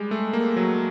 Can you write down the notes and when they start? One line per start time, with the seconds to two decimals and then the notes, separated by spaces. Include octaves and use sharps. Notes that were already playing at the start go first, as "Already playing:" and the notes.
Already playing: G3 G#3
0.11 A3
0.33 A#3
0.56 F#3